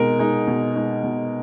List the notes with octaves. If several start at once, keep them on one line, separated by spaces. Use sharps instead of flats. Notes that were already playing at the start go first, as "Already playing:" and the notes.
Already playing: B2 G#3 D#4 A#4
G#3 D#4
B2
G#3 D#4
B2